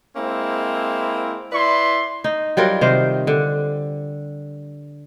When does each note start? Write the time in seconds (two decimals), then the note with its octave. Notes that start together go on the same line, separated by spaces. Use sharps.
0.16 G#3 A#3 C4 E4
1.52 E4 B4 D5 C6
2.24 D#4
2.57 F#3 G3 F4 A#4
2.81 C3 D#3 C5
3.27 D3